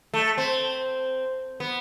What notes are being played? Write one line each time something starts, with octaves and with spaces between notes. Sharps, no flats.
A3
C4
B3